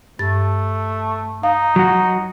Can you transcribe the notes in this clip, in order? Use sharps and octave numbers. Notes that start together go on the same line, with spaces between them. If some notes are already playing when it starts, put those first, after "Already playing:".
G2 A3 A6
D#4 F5
F#3 F#4